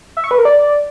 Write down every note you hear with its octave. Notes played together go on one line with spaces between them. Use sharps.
E5
C#6
B4
A#4
D5